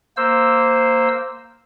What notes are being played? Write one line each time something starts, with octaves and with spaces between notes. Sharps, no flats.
A#3 C5 E6